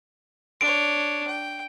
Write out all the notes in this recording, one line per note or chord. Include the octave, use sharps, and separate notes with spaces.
D4 C#5 D7
G5